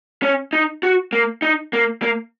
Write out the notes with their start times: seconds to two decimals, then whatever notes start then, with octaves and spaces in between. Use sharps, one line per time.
0.23 C#4
0.53 D#4
0.83 F#4
1.13 A#3
1.42 D#4
1.73 A#3
2.02 A#3